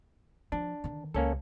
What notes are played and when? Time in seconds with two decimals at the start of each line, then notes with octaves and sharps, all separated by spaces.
0.52 F3 D4
0.84 D3 D#3
1.14 C#2 A#3 C#4 A4